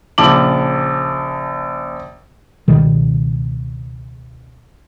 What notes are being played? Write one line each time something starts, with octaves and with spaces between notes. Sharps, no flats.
A#1 C#3 A5 D6 F#7
C#2 B2 D#3 G3